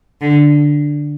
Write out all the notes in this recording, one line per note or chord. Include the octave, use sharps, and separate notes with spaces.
D3